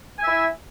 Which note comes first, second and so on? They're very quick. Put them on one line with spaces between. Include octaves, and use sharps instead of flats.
G#5 E5 E4